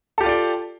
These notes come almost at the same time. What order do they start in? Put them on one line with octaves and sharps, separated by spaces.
A4 G4 F4 D5 G5